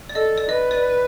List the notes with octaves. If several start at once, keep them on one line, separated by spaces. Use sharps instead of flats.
D5
A4 D#5
D5
B4 D#5
D5